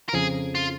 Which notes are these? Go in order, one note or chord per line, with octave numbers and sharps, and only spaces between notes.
A#4
F2 C#3 F3 G#4
F4